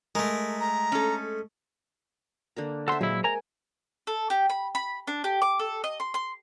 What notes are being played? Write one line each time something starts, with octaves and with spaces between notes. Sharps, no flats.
G#3 A3 A#4
A#5
C#4 A4
D3 A#3 A#5
A4 C5 E5 F#5 C6
A#2 F#3 G#3 E4
A#4 G#5 A#5
A4
G4
B5
B5
D4
G4
D6
A4
D#5
C6
C6